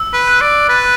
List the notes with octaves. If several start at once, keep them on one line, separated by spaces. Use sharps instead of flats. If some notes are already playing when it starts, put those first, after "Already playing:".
Already playing: E6
B4
F#6
D5
B4 A6